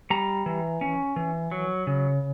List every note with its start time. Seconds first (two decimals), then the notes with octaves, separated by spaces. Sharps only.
0.10 G3 A#5
0.46 E3
0.81 C#4
1.16 E3
1.51 F#3
1.87 C#3